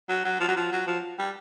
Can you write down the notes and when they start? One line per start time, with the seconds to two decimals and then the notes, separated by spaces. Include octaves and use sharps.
0.09 F#3
0.25 F#3
0.40 F3
0.48 F#3
0.57 F3
0.72 F#3
0.87 F3
1.19 G3